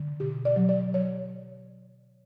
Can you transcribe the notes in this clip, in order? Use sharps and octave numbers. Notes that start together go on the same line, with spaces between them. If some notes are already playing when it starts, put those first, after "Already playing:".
Already playing: D3
B2 G4
D5
F#3
D5
F#3 C#5